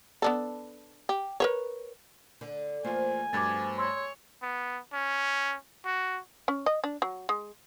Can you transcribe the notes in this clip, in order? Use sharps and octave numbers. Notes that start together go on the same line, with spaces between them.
B3 D4 A4
G4
A#4 B4 C#5
D3
E2 A3 A#3 F4 C5 G#5
G2 F3 F#3 A3 B3 D6 G#6 A6
C#5 C6 E6
B3
C#4
F#4
C#4
D#5
D4
F#3
G#3